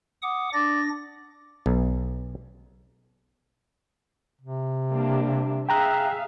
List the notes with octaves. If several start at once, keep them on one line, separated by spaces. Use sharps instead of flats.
F#5 D6 D#6
D4 D5 A#6
B1
C3
G3 A#3 D4
G#4 E5 F5 G5 A#5 F#6